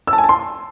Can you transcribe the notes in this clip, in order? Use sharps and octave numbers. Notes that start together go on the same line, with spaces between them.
E6
A5
G#5
A5
C6